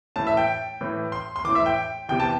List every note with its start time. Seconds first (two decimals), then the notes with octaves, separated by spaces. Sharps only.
0.16 A2 E3 A5
0.27 E5
0.37 G5
0.81 A2 E3
1.12 C6
1.36 C6
1.44 A2 E3 D6
1.55 E5
1.66 G5
2.09 E2 C3 E3 G5
2.20 A5